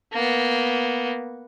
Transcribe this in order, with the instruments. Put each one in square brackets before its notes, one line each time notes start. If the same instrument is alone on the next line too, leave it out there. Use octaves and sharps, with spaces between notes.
[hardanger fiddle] A#3 B3